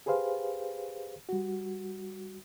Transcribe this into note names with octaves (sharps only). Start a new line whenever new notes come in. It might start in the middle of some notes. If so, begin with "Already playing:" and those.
G4 G#4 B4 C5 F5
G3 F#4